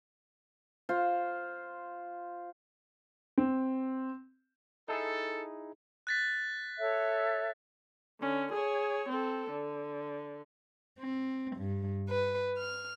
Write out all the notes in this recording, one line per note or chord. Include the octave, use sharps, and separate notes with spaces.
F4 C5
C4
D#4 E4 G#4 A4
F#6 A6 B6
A4 C#5 E5
D3 C#4
G#4 C#5
C4 A4
D3
C4
G2
B4
F6